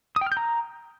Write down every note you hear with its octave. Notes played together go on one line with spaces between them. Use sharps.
D#6
G5
F6
G6
A#5